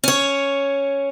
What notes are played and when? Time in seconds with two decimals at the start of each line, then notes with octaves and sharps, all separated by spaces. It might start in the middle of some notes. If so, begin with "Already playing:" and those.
0.04 C#4 C#5